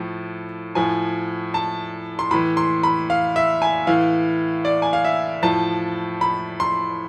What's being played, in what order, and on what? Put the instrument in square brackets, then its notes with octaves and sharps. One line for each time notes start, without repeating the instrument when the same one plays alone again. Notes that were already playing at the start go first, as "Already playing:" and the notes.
Already playing: [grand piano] A2 F3
A2 F3 G#5
A5
C6
A2 B5
E3
C6
B5
F5
E5
G#5
A2 E3 F5
D5
G#5
F5
E5
A2 F3 A5
B5
C6